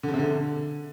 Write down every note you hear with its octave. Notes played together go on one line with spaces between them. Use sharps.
D3
C#3
C3
D3